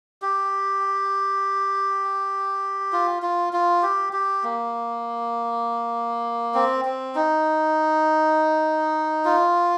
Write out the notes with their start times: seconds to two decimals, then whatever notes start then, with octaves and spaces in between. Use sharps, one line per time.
0.22 G4
2.93 F4
3.22 F4
3.53 F4
3.83 G4
4.13 G4
4.44 A#3
6.55 C4
6.85 C4
7.15 D#4
9.25 F4